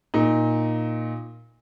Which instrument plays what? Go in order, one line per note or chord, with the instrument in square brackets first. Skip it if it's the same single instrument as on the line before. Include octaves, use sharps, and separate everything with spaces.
[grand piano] A#2 D#4